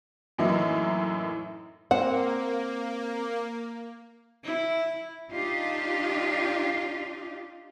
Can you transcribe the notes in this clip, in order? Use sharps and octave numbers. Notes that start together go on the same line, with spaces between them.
F#2 A2 E3 A#3 D#4 E4
A#3 C4 F#5
E4
D4 D#4 F4 G4